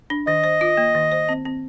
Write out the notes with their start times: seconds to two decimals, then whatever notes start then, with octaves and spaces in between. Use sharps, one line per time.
0.10 D4
0.27 D#3 D#5
0.44 C5
0.61 F4
0.77 A#3
0.95 D#3
1.12 C5
1.29 C4
1.45 C4